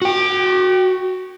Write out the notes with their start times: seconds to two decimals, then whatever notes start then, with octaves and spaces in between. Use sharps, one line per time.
0.02 F#4 G5